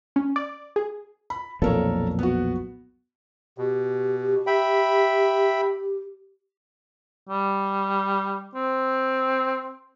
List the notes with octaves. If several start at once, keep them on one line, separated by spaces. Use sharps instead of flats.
C#4
D5
G#4
B5
B1 F2 A#2 A4 A#4 C#5
B3 F#4
B2 G4
E5 G5 B5
G3
C4